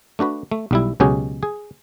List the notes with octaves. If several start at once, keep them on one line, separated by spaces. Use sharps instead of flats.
A3 D4 F#4 B4
A3
B1 G3 E4
C#2 B2 F#3 C#4 G4 G#4
G#4